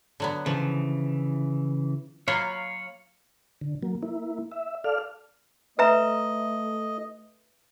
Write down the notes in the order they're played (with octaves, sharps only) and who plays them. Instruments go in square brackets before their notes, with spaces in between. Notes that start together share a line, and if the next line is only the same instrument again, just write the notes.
[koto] D3 F#3 B3
[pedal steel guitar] C#3 E3 [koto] F3
[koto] F#3 A#3 F4 [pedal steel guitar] C#5 F5 B5
[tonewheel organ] D3
F#3 A#3
A#3 E4
E5
A4 D5 F5 F6
[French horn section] A3 [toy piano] B4 E5 A#5 [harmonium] D#5